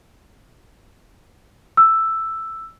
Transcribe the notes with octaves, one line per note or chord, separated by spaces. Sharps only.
E6